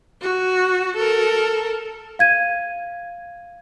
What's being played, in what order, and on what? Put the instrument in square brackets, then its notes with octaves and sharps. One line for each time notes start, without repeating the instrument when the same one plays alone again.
[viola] F#4
A4 A#4
[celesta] F5 G#6 D#7